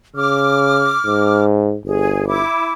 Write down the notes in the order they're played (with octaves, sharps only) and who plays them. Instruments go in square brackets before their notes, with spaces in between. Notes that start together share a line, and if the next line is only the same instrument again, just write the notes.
[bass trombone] C#3 [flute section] D6 F6
[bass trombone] G#2
[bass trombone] G1 [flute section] G#4
[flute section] E4 D6